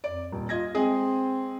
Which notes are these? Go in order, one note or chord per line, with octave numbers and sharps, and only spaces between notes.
F2 D5
D#1
F4 D#5 G#6 A#6
G#3 C4 G#4 D#5